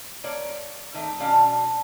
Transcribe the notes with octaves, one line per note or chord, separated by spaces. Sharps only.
A#3 C#5 D5
D#3 A3 D5 E5
B2 C#4 D4 D5 F5 A5